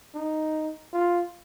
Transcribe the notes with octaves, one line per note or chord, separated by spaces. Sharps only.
D#4
F4